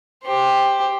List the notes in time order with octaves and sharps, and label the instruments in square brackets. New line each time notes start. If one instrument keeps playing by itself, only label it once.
[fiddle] G4 C5